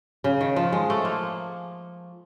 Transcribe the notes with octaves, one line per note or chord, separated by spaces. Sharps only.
C#3
D#3
F3
G#3
A3
A#3